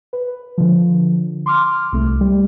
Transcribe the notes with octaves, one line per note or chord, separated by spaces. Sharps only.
B4
D3 F3
C6 D6 F6
C2 A3
G3